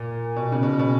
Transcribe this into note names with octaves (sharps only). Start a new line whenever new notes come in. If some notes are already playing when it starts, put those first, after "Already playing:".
Already playing: A#2
B2
C#3
B2
B2